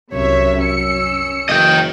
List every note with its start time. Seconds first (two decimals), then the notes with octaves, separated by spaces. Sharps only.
0.13 C2 F#2 C3 C#5 E5
0.60 C#4 E6 C#7
1.49 F#1 D#5 G5